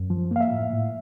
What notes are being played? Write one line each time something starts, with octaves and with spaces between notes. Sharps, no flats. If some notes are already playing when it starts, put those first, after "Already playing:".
Already playing: F#2
F3
A#3 F5
E5
A2
A2